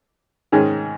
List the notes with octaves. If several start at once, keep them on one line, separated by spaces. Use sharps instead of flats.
G#2 D#3 G#3 C#4 G#4